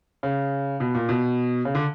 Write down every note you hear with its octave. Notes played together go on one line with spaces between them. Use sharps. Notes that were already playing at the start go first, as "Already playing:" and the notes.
C#3
B2
A#2
B2
C#3
D3